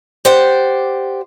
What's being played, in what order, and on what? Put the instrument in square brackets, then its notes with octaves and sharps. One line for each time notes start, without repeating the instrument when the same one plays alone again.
[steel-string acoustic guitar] G4 C5 D5 F#5